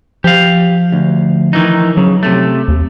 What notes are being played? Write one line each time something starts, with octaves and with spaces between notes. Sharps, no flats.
F3 G4 F5
D2
D#3 E3 D#4
C#3 F#3
C3 A3
D#2